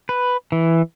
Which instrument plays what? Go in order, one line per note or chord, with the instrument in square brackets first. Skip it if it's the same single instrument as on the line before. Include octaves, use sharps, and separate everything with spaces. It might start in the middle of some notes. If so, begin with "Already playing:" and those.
[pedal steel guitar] B4
E3